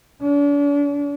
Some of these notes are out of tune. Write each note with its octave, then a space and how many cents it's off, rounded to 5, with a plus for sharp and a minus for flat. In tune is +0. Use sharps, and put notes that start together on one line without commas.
D4 -40